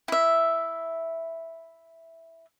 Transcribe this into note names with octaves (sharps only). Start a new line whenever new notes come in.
E4 E5